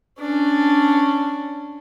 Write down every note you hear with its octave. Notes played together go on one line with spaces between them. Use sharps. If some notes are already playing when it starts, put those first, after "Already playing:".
C#4 D4